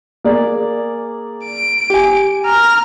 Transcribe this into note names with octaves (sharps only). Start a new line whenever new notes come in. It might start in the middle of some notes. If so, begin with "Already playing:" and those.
A#3 G#4 D5
D7
G4 G#5
A#5 F6